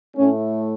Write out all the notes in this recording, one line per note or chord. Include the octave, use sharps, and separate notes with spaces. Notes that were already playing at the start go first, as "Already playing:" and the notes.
A2 A3 C#4